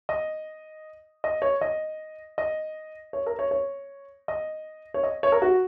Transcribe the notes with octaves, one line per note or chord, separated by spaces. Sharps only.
D#5
D#5
C#5
D#5
D#5
C#5
A#4
C#5
C#5
D#5
C#5
D#5
C#5
A#4
F#4